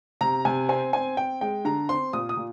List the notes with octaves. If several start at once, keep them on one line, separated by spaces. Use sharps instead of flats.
C3 A#5
C3 G#5
C4 G#5
C4 G#5
C4 G5
G#3 G5
D3 A#5
C4 C6
A#2 D#6
D#6
A#2